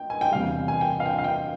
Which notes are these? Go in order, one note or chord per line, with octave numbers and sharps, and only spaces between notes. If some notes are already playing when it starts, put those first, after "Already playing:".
Already playing: G5
G#5
G5
E2 C3 G3 F5
G#5
G5
F5
G5
F5
G5